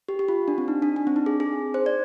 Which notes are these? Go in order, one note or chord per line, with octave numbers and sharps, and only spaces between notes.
G4
G4
F4
D4
C4
D#4
D4
D4
C4
D#4
G#4
G#4
C5
D5